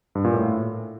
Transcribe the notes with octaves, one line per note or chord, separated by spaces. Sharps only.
G2
A#2
A2